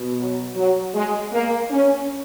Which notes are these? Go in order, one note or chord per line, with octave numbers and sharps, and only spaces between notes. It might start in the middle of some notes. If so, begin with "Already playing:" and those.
Already playing: B2
F#3
F#3
G#3
A#3
C#4